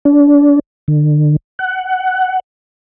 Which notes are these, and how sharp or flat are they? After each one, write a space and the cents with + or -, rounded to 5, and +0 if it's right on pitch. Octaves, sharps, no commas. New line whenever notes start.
D4 -30
D3 +35
F#5 +15